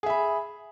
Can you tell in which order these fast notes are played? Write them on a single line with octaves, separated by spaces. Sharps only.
G#4 E5 B5